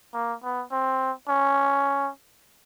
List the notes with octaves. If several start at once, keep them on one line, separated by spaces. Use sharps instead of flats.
A#3
B3
C4
C#4